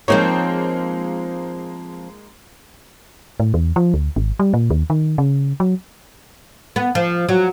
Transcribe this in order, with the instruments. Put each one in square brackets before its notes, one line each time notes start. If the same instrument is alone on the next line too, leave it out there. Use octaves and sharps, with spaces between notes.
[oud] F3 C4 C#5 [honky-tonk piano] G#3 A#3 D#4
[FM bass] A2
E2
F3
D2
G#1
G3
A#2
D#2
D#3
C#3
F#3
[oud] B3
F3
F#3